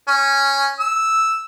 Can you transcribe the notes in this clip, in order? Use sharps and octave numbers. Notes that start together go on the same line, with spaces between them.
C#4
E6